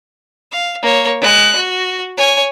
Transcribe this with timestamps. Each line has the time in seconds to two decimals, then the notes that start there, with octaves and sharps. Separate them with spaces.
0.52 F5
0.82 A#3 C#5
1.21 G#3 F#6
1.56 F#4
2.17 C#5 G#5